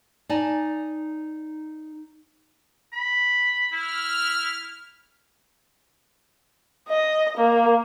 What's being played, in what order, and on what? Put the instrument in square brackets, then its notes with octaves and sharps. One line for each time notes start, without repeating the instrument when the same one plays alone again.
[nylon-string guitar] D#4 D5 G#5 A5
[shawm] B5
[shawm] E4 [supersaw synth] F6
[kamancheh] D#5
A#3